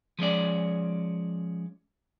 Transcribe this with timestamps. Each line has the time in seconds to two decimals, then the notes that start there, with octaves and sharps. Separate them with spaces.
0.19 F3 G#3 C#4 D5